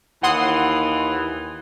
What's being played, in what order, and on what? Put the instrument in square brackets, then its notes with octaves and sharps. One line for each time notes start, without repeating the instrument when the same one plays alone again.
[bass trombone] D#2 [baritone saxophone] E3 [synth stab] F#5 C6 D#6